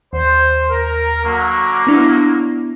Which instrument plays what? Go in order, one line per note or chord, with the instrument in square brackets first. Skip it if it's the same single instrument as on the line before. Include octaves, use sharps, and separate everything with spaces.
[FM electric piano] D#2 [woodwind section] C5
[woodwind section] A#4
D3 F#3 A#3
[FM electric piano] B3 D4 E4